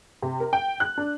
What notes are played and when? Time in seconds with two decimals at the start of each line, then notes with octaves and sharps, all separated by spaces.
0.22 C3
0.40 A#4
0.53 G5
0.80 F#6
0.98 D4